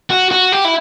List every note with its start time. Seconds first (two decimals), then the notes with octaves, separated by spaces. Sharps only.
0.10 F#4
0.31 F#4
0.52 G4
0.65 E4